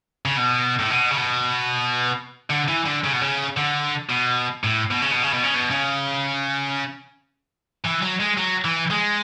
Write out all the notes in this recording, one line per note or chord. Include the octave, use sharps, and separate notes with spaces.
C#3
B2
A2
B2
C#3
B2
D3
E3
D3
C#3
B2
C#3
D3
B2
A2
B2
C#3
B2
C#3
B2
C#3
B2
C#3
E3
F#3
G#3
F#3
E3
G#3